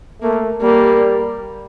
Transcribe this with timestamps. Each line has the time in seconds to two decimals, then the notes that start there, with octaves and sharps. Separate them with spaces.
0.22 A3 A#3
0.62 G3 A#3